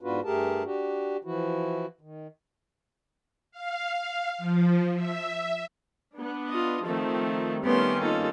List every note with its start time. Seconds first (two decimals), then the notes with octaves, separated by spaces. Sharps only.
0.01 G#2 B3 D4 F4 F#4 B4
0.24 G2 A3 G4 G#4 A#4 A5
0.64 D4 F#4 G4
1.24 E3 F3 E4 F#4
2.01 D#3
3.52 F5
4.38 F3
4.95 E5
6.17 B3 D4
6.49 F4 D#5
6.86 D#3 F3 A3 C4 A4
7.64 D#3 G3 A3 B3 C#4 G4 C6
8.00 A#3 D#4 F4 A4